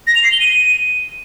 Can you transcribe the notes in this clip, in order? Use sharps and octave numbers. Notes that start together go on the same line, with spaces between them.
A#6
F7
C7
G7
D#7